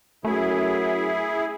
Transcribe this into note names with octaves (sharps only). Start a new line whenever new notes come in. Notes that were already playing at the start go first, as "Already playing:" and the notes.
F#2 A3 E4 G#4